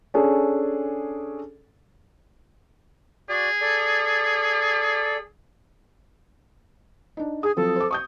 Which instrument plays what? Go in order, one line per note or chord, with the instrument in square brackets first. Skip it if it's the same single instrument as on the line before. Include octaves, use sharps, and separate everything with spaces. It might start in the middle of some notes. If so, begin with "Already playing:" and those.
[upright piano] C#4 D4 G#4 A4
[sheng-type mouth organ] F#4 D5 [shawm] G#4
[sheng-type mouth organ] A4 D5
[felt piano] D4 D#4
[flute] G#4 [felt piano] D#6
[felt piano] F3 F#3 C4 [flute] A4
[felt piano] C5 D6
C#6 D#6 G6